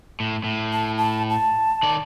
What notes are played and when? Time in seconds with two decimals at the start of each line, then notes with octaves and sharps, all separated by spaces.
0.20 A2
0.44 A2
0.73 A5
0.98 A5
1.30 A5
1.83 D#3 D5